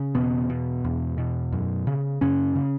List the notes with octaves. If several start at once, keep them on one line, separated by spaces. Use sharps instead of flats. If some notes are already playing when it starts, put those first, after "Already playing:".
Already playing: C#3
E2 B2 B3
B2
E2
B2
F#2
C#3
F#2 C#3 C#4
C#3